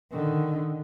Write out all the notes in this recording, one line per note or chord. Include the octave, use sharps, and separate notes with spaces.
D3 D#3